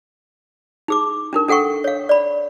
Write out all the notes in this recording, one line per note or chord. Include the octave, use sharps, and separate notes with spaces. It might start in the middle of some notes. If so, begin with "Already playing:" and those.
D#4 G#4 D6
D4 D#4 A#4
D4 A4 F#5 G5 C#6
C#5 F5
D5 B5